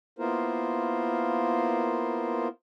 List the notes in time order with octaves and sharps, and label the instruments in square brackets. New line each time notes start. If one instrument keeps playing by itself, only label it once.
[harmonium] A#3 B3 E4 F4 A#4 C5